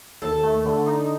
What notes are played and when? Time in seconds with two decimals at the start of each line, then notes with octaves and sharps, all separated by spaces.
0.22 D#2 A4
0.43 A3
0.65 D3
0.86 D#4